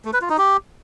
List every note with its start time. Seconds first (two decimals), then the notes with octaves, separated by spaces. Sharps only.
0.05 A3
0.13 B4
0.21 F4
0.30 D#4
0.38 G4